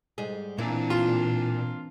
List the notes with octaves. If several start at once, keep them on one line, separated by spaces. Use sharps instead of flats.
G#2 G3 G#4
A#2 E3 A#3 C4 D4 E4
F4